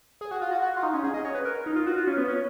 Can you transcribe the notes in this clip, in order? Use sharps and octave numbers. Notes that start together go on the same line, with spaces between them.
G#4
F#4
F4
F#4
F#4
F4
D#4
C#4
G#4
D#5
C#5
B4
A#4
D#4
F4
F#4
F4
C#4
B3
C#4